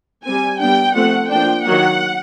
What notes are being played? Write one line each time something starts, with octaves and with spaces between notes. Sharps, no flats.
G3 C4 G#5
G3 B3 D4 G5
F3 A3 C4 F#5
F3 A#3 D4 G5
D#3 F#3 A#3 F#5